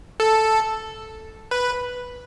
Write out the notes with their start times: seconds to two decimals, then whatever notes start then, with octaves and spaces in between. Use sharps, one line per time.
0.20 A4
1.51 B4